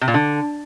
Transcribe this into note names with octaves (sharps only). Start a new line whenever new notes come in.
C3
A#2
D3